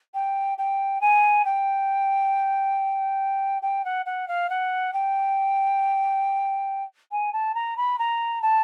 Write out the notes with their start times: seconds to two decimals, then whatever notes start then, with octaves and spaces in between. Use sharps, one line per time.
0.14 G5
0.58 G5
1.01 G#5
1.45 G5
3.62 G5
3.85 F#5
4.06 F#5
4.28 F5
4.50 F#5
4.94 G5
7.12 G#5
7.33 A5
7.55 A#5
7.77 B5
7.99 A#5
8.42 A5